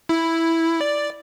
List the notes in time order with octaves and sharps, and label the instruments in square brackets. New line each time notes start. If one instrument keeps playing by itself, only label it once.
[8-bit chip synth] E4
D5